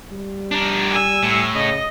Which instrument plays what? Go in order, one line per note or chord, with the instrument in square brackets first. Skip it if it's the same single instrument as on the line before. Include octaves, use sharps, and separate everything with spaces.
[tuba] G3
[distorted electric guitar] D4 A#4
[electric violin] G#5 E6
[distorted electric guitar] A2
[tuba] C#3 [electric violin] D#5